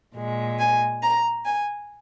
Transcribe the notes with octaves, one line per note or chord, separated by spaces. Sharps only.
A#2 G#3
G#5
A#5
G#5